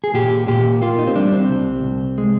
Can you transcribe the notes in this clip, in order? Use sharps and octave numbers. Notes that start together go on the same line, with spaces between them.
G#4
A#2 G4
A#2 G4
A#3 F4
D#4
C4
G3 D4
C4
C2
C2
G#3